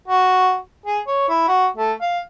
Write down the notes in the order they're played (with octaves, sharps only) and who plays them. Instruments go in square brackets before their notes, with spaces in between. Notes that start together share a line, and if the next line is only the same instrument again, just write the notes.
[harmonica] F#4
G#4
C#5
E4
F#4
A3
F5